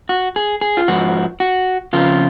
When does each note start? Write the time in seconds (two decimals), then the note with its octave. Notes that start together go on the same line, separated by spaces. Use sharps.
0.09 F#4
0.36 G#4
0.61 G#4
0.77 F4
0.88 G#2 F3 F#4
1.40 F#4
1.93 F2 C#3 F3 F4